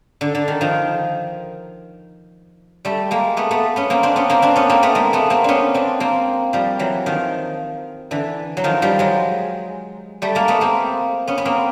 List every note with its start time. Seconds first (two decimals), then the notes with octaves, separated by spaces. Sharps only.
0.21 D3
0.35 D3
0.48 D#3
0.61 D#3 F3
2.85 G3 A3
3.11 G#3 A#3
3.37 A3 B3
3.51 A3 B3
3.76 B3 C#4
3.90 A#3 C4
4.03 C4 D4
4.16 B3 C#4
4.30 A#3 C4
4.42 C4 D4
4.56 B3 C#4
4.70 A#3 C4
4.83 A3 B3
4.95 G#3 A#3
5.13 A3 B3
5.30 A#3 C4
5.44 B3 C#4 D4
5.74 C4 D4
6.00 A#3 C4
6.53 F3 G3
6.79 E3 F#3
7.06 D#3 F3
8.11 D3 E3
8.57 F#3
8.64 D#3 F3
8.82 F3 G3
8.99 F#3 G#3
10.22 G3 A3
10.35 G#3 A#3
10.48 A3 B3
10.61 A#3 C4
11.27 B3 C#4
11.38 B3
11.45 A#3 C4